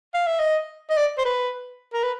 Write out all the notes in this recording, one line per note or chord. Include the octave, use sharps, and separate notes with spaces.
F5
E5
D#5
D#5
D5
C5
B4
A#4
B4